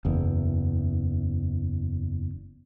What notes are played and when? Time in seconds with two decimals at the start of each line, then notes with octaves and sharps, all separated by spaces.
0.05 F#1 E2